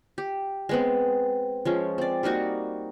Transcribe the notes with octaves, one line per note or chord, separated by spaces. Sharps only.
G4
G#3 B3 C4
F3 G#3 C#4
C4 D5
G3 A#3 D#4 F#4